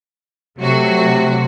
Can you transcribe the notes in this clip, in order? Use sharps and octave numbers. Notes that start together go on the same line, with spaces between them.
C3 F#3 A3 F#4